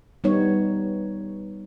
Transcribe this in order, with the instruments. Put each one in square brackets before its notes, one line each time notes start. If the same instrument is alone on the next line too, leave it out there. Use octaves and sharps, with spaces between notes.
[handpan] G3 B3 D#4 C#5